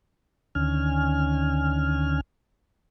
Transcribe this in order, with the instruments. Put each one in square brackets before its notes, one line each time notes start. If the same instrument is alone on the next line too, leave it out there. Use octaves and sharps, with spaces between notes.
[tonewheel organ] D2 D3 D#3 C#4 G#5 F6